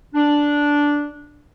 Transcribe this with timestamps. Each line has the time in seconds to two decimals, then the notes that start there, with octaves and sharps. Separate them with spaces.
0.14 D4